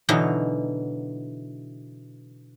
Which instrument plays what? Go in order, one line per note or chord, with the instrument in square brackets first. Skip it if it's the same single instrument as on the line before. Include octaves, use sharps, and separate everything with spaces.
[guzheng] B2 D3 E3 F#3 D#4